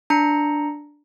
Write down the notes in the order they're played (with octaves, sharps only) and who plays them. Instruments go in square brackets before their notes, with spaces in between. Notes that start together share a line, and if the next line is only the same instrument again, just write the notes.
[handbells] D4 A#5 C#7